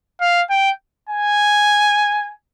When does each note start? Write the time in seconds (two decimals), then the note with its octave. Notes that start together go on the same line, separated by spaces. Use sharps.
0.21 F5
0.50 G5
1.09 G#5